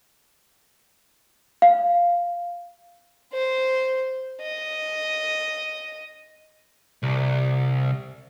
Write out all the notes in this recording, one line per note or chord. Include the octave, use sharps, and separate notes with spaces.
F5
C5
D#5
C2